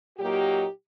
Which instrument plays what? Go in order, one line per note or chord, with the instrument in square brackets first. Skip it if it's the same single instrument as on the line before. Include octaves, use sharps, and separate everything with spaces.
[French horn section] A#2 F#3 A#3 D#4 G4